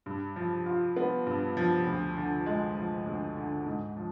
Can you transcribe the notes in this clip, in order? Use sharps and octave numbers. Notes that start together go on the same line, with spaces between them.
G2
F3
F4
B3
G2
F3
D2
D3
G#3
F3
D2
D3
G#2
F3